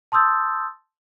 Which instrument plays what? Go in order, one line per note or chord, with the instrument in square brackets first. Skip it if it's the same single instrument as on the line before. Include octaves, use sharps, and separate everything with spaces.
[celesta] A5 C6 D#6 E6 G6 A6